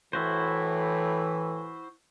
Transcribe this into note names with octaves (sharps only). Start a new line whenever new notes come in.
A2 E3 E4 F#4 C5